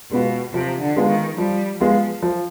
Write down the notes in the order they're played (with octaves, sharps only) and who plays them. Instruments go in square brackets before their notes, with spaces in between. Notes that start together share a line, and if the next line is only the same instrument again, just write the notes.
[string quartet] B2 [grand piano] G#3 B3 F4
[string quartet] C3 [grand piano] F3
[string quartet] D3
[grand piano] G#3 B3 F4
[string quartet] D#3
[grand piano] F3 [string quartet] G3
[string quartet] F3 [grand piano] G#3 B3 F4
[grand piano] F3